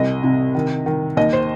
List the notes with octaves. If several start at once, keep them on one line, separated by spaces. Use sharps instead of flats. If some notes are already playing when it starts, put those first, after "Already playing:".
Already playing: C2 D#5
C3
D#3
D#3
D#2 D#5
C5